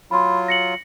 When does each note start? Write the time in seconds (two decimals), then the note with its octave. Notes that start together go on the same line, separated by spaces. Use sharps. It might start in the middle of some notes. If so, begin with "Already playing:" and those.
0.11 F#3 F4 B5 C6
0.48 A#6 C#7 F#7